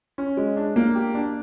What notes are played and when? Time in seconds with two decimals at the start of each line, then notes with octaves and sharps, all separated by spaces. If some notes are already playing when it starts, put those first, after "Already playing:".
0.18 C#4
0.37 G#3
0.57 D4
0.76 A#3
0.95 G4
1.15 D4